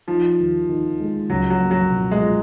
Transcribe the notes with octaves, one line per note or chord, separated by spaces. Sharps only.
F3 D#4
D#2
D#3
G#3
C#2 F#3
F#3
A#3
F#3
B2
G#3
F4